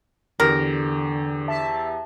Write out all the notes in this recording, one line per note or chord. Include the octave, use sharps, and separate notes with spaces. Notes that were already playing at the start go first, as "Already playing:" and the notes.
E2 D3 G4 A#4
E5 A5